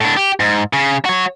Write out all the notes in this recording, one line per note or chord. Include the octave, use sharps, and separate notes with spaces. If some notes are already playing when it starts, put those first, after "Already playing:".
A2 D4
G4
G#2
C#3
F#4 C#5